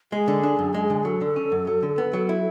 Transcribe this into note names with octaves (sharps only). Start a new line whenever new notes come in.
G#3 G#4
D3
D4
F#2
G#3
D3
F#3 A4
D3
C#4
F#2
F#3
D3
B3
F#3
E4